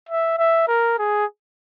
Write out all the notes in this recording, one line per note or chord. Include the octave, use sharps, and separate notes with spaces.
E5
E5
A#4
G#4